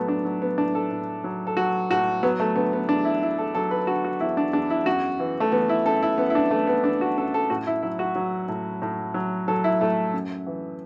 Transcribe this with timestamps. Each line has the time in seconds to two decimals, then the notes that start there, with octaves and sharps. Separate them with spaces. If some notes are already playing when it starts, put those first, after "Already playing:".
Already playing: A2 F#3 A3 B3
0.08 D4
0.25 F#3
0.42 B3
0.58 A2 D4
0.75 A4
0.91 A2
1.24 F#3
1.47 A4
1.57 F#3 F#4
1.90 A2 F#4
2.23 F#3 B3
2.40 A3
2.55 D3 B3
2.73 B3
2.89 E2 D4
3.05 E4
3.22 E2 E4
3.38 A4
3.55 F#3 A4
3.71 B4
3.87 D3 F#4
4.05 F#4
4.20 E2 E4
4.37 D4
4.53 E2 D4
4.70 E4
4.86 F#2 F#4
5.20 E3
5.40 A3
5.52 E3 B3
5.69 E4
5.86 F#2 A4
6.02 E4
6.18 F#2 B3
6.30 E4
6.35 D4
6.51 E3 A3
6.67 B3
6.84 E3 D4
7.01 F#4
7.18 F#2 A4
7.34 A4
7.50 A2 F#4
7.67 E4
7.82 F#3 E4
7.99 F#4
8.15 F#3
8.48 A2
8.82 A2
9.14 F#3
9.48 F#3 A4
9.64 E4
9.80 A2 A3
10.13 F#2
10.46 E3